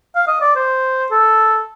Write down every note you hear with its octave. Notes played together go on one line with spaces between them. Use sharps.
F5
D#5
D5
C5
A4